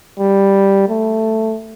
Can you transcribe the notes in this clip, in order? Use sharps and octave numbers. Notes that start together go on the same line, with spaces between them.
G3
A3